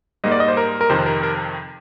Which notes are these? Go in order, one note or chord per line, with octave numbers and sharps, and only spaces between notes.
G#2 G3 A#3 D#5
D5
D#5
C5
A#4
A#4
F2 C3 D#3 C5
A#4
A#4